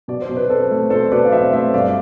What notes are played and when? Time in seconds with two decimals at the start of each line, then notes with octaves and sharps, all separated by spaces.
0.08 B2 D5
0.22 C5
0.29 B2
0.37 B4
0.50 C4 A4 C5
0.71 A3
0.90 B2 A4 C5
1.11 B2 B4 D5
1.24 F5
1.32 C4 C5 E5
1.52 A3 C5 E5
1.74 G2 D5 F5